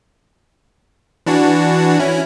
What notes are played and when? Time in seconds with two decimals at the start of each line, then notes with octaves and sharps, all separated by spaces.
1.26 E3 D4 F#4
1.99 C#4 E4